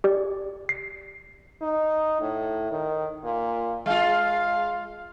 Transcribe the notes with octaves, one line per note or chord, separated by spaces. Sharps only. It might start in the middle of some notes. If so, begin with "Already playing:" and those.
G4 D5
C7
D#4
A2
D#3
A#2
G#3 F4 F5